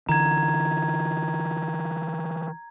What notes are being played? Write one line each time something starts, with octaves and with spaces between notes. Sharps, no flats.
D3 E3 A#5 G#6